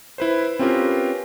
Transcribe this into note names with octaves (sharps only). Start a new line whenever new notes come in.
E4 B4 C5
C4 C#4 F4 G4 A#4 B4